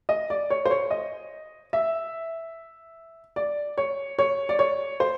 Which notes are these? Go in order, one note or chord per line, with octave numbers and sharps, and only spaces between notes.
D#5
D5
C#5
C5
C#5
D#5
E5
D5
C#5
C#5
D5
C#5
C5